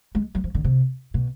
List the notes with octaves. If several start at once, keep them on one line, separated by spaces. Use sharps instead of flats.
G#3
F#3
F3
D3
C3
B2